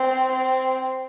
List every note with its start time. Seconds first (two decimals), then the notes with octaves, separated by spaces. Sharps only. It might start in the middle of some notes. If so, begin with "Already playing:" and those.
Already playing: C4
0.32 C4